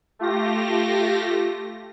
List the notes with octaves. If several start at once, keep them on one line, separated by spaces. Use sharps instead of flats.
A3 F4 G4 A#6